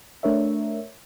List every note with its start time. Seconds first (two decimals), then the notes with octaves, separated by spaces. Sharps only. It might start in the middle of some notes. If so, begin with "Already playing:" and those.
0.23 A3 D4 A#4 C#5 E5